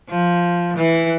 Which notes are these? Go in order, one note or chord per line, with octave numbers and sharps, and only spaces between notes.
F3
E3